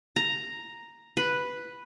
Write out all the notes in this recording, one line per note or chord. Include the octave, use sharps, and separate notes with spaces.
A#5
B4